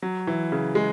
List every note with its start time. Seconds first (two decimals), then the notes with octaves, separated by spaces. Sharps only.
0.02 F#3
0.27 E3
0.52 C#3
0.75 G#3